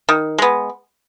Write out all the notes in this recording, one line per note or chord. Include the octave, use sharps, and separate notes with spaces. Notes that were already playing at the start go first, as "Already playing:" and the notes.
D#3
G#3 B3